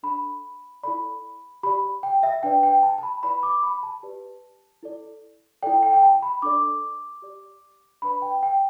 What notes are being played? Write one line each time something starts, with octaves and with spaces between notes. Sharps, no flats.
D4 A4 D5 B5
E4 A4 D5 B5
G4 D5 B5
G5
E5
D4 B4 D5 G5
G5
A5
A5
B5
E4 B4 D5 B5
D6
B5
A5
G4 B4 D5
E4 A4 D5
E4 A4 D5 G5
G5
G5
A5
B5
D4 A4 D5 D6
G4 D5
D4 B4 D5 B5
G5
G5